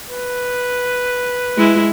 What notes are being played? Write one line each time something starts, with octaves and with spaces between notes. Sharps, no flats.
B4
G#3 E4